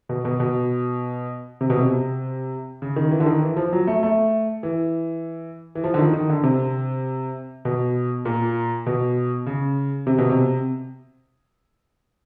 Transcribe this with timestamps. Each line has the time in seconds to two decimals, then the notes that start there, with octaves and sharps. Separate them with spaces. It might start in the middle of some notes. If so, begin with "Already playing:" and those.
0.09 B2
0.25 B2
0.40 B2
1.61 C3
1.70 B2
1.79 C3
2.82 C#3
2.96 D#3
3.11 E3
3.20 D3
3.26 D#3
3.42 E3
3.56 F3
3.73 F#3
3.87 A3
4.03 A3
4.63 E3
5.75 E3
5.84 F3
5.94 D3
5.99 D#3
6.13 D#3
6.30 D3
6.43 C3
7.65 B2
8.25 A#2
8.86 B2
9.46 C#3
10.07 C3
10.18 B2
10.30 C3